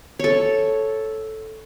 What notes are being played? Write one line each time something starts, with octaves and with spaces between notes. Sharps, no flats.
A4 C#5